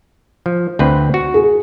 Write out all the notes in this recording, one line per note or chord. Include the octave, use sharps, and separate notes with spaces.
F3
D2 C4 B4
F#4
G#4